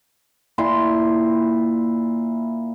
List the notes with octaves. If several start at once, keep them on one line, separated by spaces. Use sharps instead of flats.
A#2 E4 C6